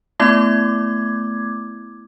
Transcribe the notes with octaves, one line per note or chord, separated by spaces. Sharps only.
A3 B3 E4 D6 G#6